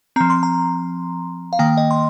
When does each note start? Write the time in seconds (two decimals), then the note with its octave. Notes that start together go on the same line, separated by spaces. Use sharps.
0.16 F3 C4 A#5
0.30 C6
0.43 A#5
1.53 F5
1.59 D#3 A#3 G5
1.77 D#5
1.91 C6